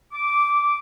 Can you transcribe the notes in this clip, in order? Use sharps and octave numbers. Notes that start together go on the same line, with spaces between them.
D6